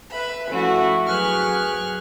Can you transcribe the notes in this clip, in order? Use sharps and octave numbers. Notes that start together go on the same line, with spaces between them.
B4 E5 B5
F3 A3 C#4 E4 F#4
F#3 G#4 B4 C#6 F6 F#6